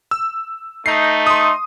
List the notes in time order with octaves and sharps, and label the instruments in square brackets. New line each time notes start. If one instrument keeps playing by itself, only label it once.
[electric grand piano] E6
[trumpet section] A3 D#4 [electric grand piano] C7
[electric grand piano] C6 D#6